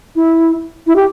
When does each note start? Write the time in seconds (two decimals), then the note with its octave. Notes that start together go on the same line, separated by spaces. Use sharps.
0.16 E4
0.87 E4
0.96 G4